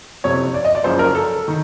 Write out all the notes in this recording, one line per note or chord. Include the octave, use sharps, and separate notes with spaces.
F#1 F2 C3 C#5
D5
D#5
D5
F#1 F#2 C#3 F3 C5
A#4
A4
D#3